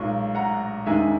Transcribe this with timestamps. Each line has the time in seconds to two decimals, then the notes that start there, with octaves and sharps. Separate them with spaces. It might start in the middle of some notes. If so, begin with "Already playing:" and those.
Already playing: B1 A#2 G#3 C#6
0.35 F#5 A#5
0.86 E1 D#2 D#3 G#3 E5 G#5